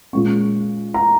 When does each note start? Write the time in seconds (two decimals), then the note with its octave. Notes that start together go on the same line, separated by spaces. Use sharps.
0.13 A#2 G#3 C#4 C#6
0.94 A#5